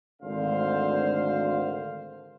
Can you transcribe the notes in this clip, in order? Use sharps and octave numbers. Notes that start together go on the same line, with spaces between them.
G#1 D2 D3 C5 F5